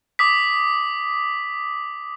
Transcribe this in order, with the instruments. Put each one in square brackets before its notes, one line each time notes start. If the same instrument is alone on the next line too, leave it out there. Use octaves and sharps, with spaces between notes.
[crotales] D6 D#6 B6